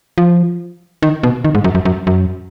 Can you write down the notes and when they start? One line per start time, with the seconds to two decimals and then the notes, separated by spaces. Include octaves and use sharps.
0.18 F3
1.02 D#3
1.23 B2
1.44 D#3
1.55 G#2
1.64 F#2
1.75 F#2
1.85 F#2
2.07 F#2